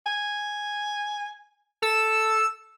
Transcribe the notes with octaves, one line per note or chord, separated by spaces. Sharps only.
G#5
A4 E6